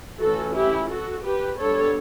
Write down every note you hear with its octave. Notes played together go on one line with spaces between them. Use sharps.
E3 A3 C#4 F#4 A4
E4 G4
F#4 A4
G4 B4
G3 B3 D4 A4 C#5